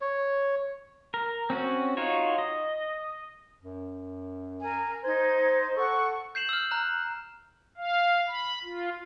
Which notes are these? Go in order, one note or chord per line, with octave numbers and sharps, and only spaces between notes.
C#5
A#4
C4 C#4 F#4
D#4 F4 F#4 C#5
D#5
F#2
A#4 G#5
D#4 C5 G#6
A4 F#5 C#6
G6 C7 E7 F#7
E6 F6
A#5 F#6 E7
F5
B5
F4